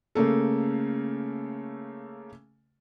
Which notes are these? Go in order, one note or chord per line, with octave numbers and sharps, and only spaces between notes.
C#3 A3 A#3 A4